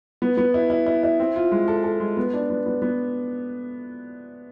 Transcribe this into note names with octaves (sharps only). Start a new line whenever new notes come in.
B3
B3
E4
E4
E4
E4
C4
F4
G#3
A4
A4
G#3
B3
D4
B3
B3
B3